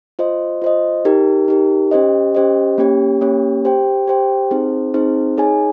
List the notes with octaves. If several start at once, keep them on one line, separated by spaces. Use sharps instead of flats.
F4 C5 D#5
F4 C5 D#5
D#4 G4 A#4
D#4 G4 A#4
C#4 G4 C5 D#5
C#4 G4 C5 D#5
A#3 C#4 G4 C#5
A#3 C#4 G4 C#5
G4 C5 G5
G4 C5 G5
C4 D#4 G#4 C5
C4 D#4 G#4 C5
D#4 G#4 C#5 G#5